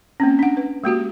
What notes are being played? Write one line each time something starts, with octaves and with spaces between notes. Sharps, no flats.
A#3 C4 C#4
D4 F#5
B4
G#3 A#3 F#4 G4